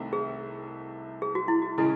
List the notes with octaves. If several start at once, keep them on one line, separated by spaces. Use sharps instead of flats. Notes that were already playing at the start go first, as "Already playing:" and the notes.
Already playing: C2 C3 D#3 A3
G#4
G#4
F#4
E4
F#4
C#3 G#3 C#4 E4 G#4